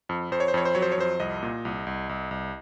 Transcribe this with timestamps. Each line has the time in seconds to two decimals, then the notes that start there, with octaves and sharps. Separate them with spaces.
0.09 F2
0.32 F2 C5
0.40 C#5
0.48 C5
0.54 F2 C#5
0.65 C5
0.75 F#3 C#5
0.82 C5
0.92 C#5
0.98 F2 C5
1.20 C2 D#5
1.43 A#2
1.65 C2
1.87 C2
2.09 C2
2.31 C2